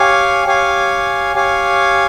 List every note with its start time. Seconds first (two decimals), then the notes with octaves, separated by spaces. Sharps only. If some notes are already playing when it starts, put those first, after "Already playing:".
Already playing: G4 C#5 F5 G#5
0.47 G4 C#5 F5 G#5
1.36 G4 C#5 F5 G#5